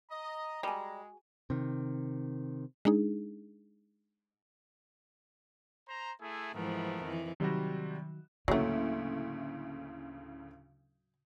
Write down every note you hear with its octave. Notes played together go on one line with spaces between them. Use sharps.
D#5 A#5
G3 G#3 F#4 G#4 G#5
C3 D#3
G#3 D4 D#4 G#4
C5 A#5
A3 E4 G#4
G#2 E3 F3 A3 B3 A#4
F2 D#3 E3
C3 D#3 F#3 G3 F#4
D2 A2 C#3 F#3 A3 A#3